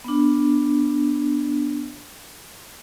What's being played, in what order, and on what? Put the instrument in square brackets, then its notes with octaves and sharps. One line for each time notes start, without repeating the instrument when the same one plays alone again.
[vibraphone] B3 D4